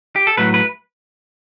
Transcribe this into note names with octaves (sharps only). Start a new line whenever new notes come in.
G4
A4
A2 F#3 A3 B4
B4